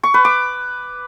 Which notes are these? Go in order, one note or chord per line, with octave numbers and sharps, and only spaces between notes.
C#6
B4
D6